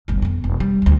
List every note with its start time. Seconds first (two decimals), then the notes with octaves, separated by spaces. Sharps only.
0.08 D1 G1
0.22 F2 B3
0.44 E1
0.60 G3
0.82 D#1 D2